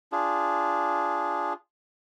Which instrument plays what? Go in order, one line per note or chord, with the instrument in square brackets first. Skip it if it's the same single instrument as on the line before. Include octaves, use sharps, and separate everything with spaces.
[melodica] D4 F4 G#4